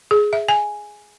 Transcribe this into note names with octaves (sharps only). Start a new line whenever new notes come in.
G#4
E5
G#5